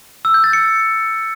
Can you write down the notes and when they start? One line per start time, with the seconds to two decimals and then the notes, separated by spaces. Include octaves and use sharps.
0.25 E6
0.34 G6
0.44 A6
0.53 C#7